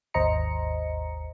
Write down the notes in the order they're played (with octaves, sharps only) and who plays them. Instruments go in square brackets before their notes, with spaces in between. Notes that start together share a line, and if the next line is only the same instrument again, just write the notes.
[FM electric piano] G#1 D#2 C5 D#5 A#5 C#7